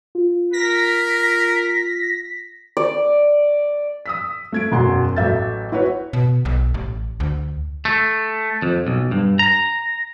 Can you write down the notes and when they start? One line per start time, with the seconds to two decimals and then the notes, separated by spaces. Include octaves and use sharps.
0.15 F4
0.53 A#4 A#6 B6
2.77 D5
4.06 D#6 E6 B6
4.52 A3 G#6 D7
4.72 E1 F#2 F#4 F#5 C6
5.16 A1 F#3 A4 E5 G6 A6
5.72 E4 F#4 B4 C#5
6.13 B2
6.45 B1
6.74 A1
7.20 D2
7.85 A3
8.62 F2
8.87 B1
9.11 G2
9.39 A#5